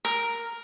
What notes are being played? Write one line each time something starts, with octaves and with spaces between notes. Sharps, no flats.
A#4